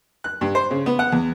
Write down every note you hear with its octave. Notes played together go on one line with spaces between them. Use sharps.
F#6
G2
C5
C#3
B3
F#5
E2